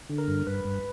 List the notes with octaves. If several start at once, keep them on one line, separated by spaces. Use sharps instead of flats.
D3
A#4
G2
G2 B4
G2